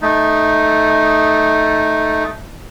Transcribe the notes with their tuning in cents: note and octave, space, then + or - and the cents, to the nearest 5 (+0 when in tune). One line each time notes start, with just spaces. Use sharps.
A3 -10 D#4 +0